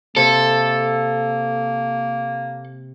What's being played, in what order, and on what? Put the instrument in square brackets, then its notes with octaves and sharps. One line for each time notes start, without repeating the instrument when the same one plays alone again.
[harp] C3 [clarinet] A#3 [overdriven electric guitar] A4